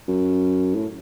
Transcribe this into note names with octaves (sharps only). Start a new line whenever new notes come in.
F#2
A2